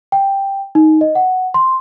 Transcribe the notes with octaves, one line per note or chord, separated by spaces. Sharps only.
G5
D#4
D#5
F#5
C6